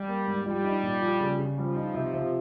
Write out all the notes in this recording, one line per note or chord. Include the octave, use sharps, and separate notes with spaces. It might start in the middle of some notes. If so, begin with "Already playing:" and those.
Already playing: G3
A#3
G#2
F3 G3
D#4
A#2
F3
C#3
C#3
F3 G3
D#4
C3
C3